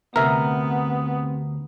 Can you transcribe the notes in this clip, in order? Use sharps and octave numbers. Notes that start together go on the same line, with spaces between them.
D2 C3 B3 A#4 E5 A#5